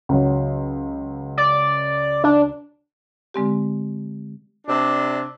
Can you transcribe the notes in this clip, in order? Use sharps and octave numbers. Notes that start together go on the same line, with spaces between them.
C#2 F#3
D5
D4
D3 G#3 C4 G4
C3 D4